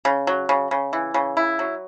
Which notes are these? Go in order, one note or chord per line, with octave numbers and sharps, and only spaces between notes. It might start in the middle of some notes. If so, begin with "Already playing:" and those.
C#3
F#3
C#3
C#3
E3
C#3
E4
F#3